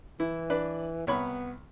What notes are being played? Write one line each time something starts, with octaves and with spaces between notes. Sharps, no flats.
E3 E4
D4 B4
C2 B3 C#5 B5